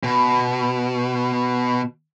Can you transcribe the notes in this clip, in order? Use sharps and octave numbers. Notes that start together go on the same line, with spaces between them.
B2